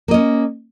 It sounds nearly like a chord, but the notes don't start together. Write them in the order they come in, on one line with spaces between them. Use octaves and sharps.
A#3 D#5 C#4